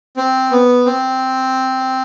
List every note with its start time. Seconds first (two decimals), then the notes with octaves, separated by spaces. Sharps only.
0.17 C4
0.51 B3
0.86 C4